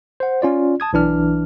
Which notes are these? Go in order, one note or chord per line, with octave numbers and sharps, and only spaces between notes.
C5 F#5
C#4 F4 D5
A5 D#6 G#6
B1 E3 D4 F6